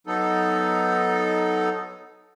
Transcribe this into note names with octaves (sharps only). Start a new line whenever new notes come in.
F#3 B3 D#4 A4